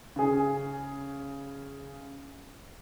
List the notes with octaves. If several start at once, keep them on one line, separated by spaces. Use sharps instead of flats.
C#3 G#4